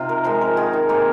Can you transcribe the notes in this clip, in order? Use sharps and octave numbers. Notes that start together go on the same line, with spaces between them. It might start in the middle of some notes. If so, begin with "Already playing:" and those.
Already playing: C3 D#4 F4
A#4
F3 G#3 C5
A#4
D#3 G#4
D#4
A#3 C4